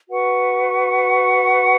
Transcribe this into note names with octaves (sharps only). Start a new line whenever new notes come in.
F#4 B4 F#5 C#6